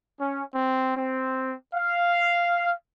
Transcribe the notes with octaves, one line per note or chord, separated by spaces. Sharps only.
C#4
C4
C4
F5